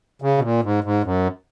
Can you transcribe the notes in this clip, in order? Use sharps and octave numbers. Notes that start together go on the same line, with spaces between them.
C#3
B2
A#2
G#2
G#2
F#2